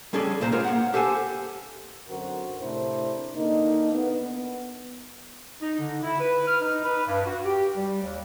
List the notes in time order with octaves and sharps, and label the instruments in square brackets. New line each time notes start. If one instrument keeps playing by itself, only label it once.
[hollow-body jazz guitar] G3 C#4 G#4 A4 D5
C2 A#2 C5 A#5
G#3 B3 F4 A#4 C#5
A#3 F#5
G4 A4 C5 F#5 G#5
[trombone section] F#2 D3 C4 F#4 A#4 C5
A2 C3 D4 E4 A#4 C5
D3 A#3 D4 D#4
B3
[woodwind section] D#4
D3
E4
B4
F6
D#4
B4
G2
F#4
G4
G3
D#2